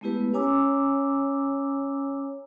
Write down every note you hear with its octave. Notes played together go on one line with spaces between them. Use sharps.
G#3 A3 B3 E4 G4 B4
C#4 C#5 G#5 A#5 D6 E6